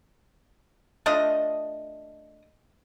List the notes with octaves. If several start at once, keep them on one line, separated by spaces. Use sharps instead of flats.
A3 D4 F4 D#5